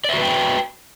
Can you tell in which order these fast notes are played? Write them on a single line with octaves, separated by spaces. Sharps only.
D5 E5 F#4 B4 G5